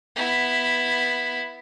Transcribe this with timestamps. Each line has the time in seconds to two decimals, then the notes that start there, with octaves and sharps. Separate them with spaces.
0.16 B3 E4